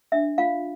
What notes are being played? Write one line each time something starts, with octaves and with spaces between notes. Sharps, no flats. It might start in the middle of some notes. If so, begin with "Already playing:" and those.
D4 E5
F4 F5